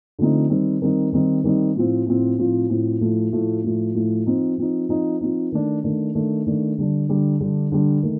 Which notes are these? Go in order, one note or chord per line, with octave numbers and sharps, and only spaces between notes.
D3 F3 A3 C4 D#4
D#3 G3 C4 D#4
D#3 G3 C4 D#4
D#3 G3 C4 D#4
D#3 G3 C4 D#4
A2 F3 C4
A2 F3 C4
A2 F3 C4
A2 F3 C4
A2 F3 A3
A2 F3 A3
A2 F3 A3
A2 F3 A3
F3 C4 D#4
F3 C4 D#4
F3 C4 D#4
F3 C4 D#4
D#3 A3 D4
D#3 A3 D4
D#3 A3 D4
D#3 A3 D4
D3 G3 D4
D3 G3 D4
D3 G3 D4
D3 G3 D4
D#3 A3